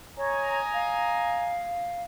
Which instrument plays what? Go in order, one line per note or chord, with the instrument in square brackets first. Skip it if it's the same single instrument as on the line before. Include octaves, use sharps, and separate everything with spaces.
[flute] C#5 [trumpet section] D#5 G#5 A#5
[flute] F5